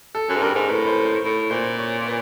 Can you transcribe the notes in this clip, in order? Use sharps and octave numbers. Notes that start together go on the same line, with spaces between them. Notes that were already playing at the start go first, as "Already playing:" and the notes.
A4
F#2
G#2
G2 A#4
G#2
A2 B4
C5
C5
A2
A#2 C5
C#5
B4